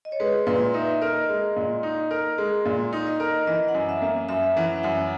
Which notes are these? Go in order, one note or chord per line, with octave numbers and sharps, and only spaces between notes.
D#5
C#5
G#3 B4
A#2 B4
D#4 E5
A#4 D#5
G#3
A#2
D#4
A#4
G#3
A#2
D#4
D#5
A#4
E3 D#5
F#5
F#2
E5
A#3
F#2 E5
E3 F#5
E5
F#2 F#5